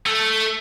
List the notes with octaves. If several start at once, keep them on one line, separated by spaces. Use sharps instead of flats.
A3